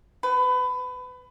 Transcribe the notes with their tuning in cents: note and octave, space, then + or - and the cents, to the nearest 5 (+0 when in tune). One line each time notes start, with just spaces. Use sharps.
B4 +25